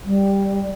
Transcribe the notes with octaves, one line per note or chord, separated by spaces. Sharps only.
G3